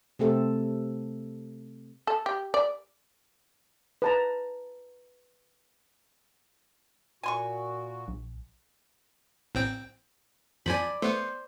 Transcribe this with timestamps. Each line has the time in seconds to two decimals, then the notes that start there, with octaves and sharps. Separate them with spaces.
0.19 C3 A3 C4 A4
2.07 A4
2.26 G4
2.54 D5
4.02 B4 A5 A#5
7.23 A#2 F#4 G#5 C6 C#6
8.08 A#1
9.55 A1 C4 G5
10.66 F2 F3 D5 G#5 B5
11.02 A3 B3 C5